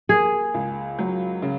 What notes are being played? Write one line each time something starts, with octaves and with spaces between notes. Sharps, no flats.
A#3 G#4
C#2
F#3
C#3